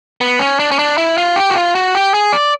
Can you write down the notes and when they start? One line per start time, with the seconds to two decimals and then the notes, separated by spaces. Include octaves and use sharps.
0.21 B3
0.39 C#4
0.59 D4
0.71 C#4
0.79 D4
0.98 E4
1.18 F4
1.36 G4
1.50 F#4
1.56 F4
1.75 F#4
1.95 G4
2.14 G#4
2.33 D5